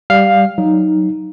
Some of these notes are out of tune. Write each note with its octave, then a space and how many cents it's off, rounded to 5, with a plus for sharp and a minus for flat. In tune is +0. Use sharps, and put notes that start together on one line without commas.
G3 +0 F5 +0
F#3 +0 D#4 +0